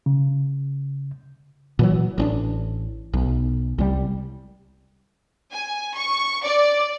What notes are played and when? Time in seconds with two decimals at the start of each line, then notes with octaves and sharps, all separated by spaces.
0.06 C#3
1.79 A#2 E3 F#3
2.18 A1 C#4 D4
3.13 B1
3.78 C2 G3
5.52 G#5
5.95 C#6
6.44 D5